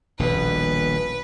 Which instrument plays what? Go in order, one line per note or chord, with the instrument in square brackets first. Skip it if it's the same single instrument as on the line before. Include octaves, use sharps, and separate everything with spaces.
[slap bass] D#1 A#1 B2 [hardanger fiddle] B4